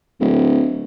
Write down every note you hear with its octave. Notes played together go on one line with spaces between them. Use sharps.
D1